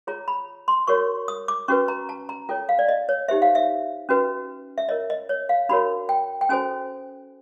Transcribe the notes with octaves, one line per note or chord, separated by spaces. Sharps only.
F4 G#4 C#5 A#5
B5
C6
F#4 A#4 C#5 C#6
D#6
D6
C#4 F#4 B4 C#6
A#5
A5
A#5
F4 A4 C#5 G5
F5
D5
D#5
C#5
D#4 G4 C5 E5
F5
E5
C#4 F#4 B4
E5
F4 A#4 C#5 D#5
D#5
C#5
F5
D4 F#4 A#4 C#5 B5
G5
G5
C#4 F#4 A4 C5 G#5